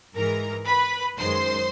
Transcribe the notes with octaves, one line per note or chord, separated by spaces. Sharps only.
G#2 E3 G#3 A#4 A#5
B4 B5
F#2 D#3 G#3 C5 C6